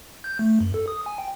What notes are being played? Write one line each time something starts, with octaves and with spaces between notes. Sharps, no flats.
G6
A3
F#2
A4
D#6
G#5
G5